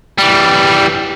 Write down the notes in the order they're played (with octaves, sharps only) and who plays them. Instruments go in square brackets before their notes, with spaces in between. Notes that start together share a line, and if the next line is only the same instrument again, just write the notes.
[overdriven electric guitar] E3 G3